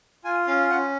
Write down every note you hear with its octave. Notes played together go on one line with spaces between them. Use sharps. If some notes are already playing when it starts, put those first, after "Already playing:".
F4 G#5
C#4 F5
C#4 F#5